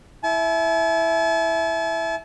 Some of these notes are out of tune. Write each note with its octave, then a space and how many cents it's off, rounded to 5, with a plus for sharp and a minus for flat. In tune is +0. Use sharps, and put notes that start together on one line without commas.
E4 +0 A5 -45